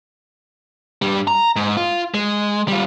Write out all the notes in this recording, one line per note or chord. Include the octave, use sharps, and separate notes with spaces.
G2 G3
A#5
G#2
F4
G#3
G3 F4